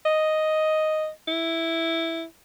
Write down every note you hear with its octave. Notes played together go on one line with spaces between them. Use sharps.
D#5
E4